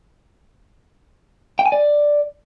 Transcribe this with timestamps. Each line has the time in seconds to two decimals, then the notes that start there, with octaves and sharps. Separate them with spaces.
1.59 G5
1.66 G#5
1.72 D5